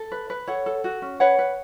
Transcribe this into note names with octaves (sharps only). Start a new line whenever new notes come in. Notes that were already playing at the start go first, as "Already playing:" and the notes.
Already playing: A4
B4
B4
A4 C#5 F#5
A4
F#4
C#4
B4 C#5 F#5
B4